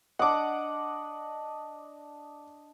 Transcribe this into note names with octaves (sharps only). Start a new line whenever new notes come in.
D4 D#5 F#5 D6